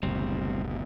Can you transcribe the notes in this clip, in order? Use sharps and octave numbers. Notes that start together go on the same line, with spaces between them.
F#1 D2 B2 G3 C4